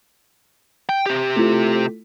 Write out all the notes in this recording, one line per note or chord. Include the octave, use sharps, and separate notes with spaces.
G5
C3 G4
A3 E4 F4